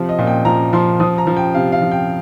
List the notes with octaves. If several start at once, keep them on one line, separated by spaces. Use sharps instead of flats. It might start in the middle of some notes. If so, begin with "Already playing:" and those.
Already playing: C3 F3
D#5
A#2
G5
F3 A#5
F3 C6
F3 D#6
A#5
F3
G5
C3 F5
F5
F3
G5